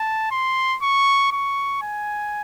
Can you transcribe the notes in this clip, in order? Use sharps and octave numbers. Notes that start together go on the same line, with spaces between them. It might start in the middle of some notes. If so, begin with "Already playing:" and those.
Already playing: A5
C6
C#6
C#6
G#5